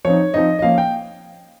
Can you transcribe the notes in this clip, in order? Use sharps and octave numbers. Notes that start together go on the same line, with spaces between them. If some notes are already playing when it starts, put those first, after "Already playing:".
F3 C4 D#4 C#5
F3 C4 D#4 D#5
D#5
F3 A#3 C#4 F5
G5